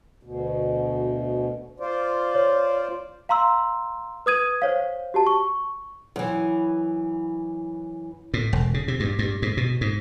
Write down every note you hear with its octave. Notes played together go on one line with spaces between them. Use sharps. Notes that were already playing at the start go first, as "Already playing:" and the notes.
D2 B2
F4 C5 D5
C#5
F5 A#5 C6 E6
B4 D#6 G#6 D#7
C5 C#5 F5
F#4 G4 A5
C#6
F#2 E3
A2
E1
C#3
C3
G2
G2
G#2
B2
G#2